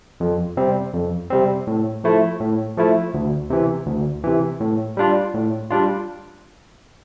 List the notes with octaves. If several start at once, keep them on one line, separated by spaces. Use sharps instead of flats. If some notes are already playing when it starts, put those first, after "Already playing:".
F2
C3 G3 C4
F2
C3 G3 C4
A2
F3 A3 E4
A2
F3 A3 E4
D2
C3 E3
D2
C3 E3
A2
G3 D4 F4
A2
G3 D4 F4